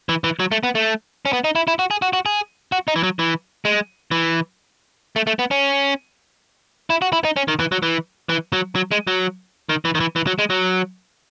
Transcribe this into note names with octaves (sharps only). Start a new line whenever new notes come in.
E3
E3
F#3
A3
B3
A3
C#4
B3
D#4
E4
E4
F#4
G#4
F#4
F#4
G#4
F#4
D#4
E3
F#3
E3
G#3
E3
A3
A3
B3
C#4
E4
F#4
E4
D#4
C#4
D#3
E3
F#3
E3
E3
F#3
F#3
G#3
F#3
D#3
E3
D#3
E3
E3
F#3
G#3
F#3